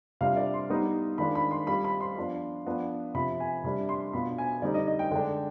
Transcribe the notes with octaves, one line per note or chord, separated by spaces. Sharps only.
C3 G3 D4 F4 F5
D5
C6
G3 B3 D#4
D#3 G#3 D4 F4 B5
B5
C6
G3 C4 F4 B5
B5
C6
F3 B3 D4 F4
F3 B3 D4 F4
C3 F3 C4 B5
G#5
C3 G3 D4 B5
C6
B2 B3 D4 F4 B5
G#5
D3 G3 C4 D#4 D5
D#5
D#5
G5
D3 G#3 D4 G5